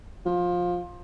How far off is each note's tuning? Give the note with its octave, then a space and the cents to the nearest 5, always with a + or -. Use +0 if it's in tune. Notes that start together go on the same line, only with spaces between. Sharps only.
F3 +20